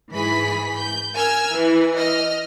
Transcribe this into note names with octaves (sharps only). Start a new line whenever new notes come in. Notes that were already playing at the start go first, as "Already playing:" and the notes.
G#2 E3 G#4 B5 B6
G6
A#4 G#5 E6 F6 G#6
E3
D#5 F6